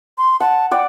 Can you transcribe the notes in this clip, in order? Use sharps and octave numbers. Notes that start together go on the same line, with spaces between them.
C6
F#5 A5
D5 F#5 G5